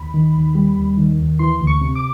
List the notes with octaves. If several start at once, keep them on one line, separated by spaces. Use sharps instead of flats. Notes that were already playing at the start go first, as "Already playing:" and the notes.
Already playing: D#2 B5
D#3
D#2
G3
D#2
D#3
D#2
E3 C6
D2
C#6
C3
D6